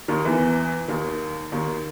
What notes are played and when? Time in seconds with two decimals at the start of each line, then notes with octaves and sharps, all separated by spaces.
0.08 D#2 D#3
0.25 E2 E3
0.88 D#2 D#3
1.52 D#2 D#3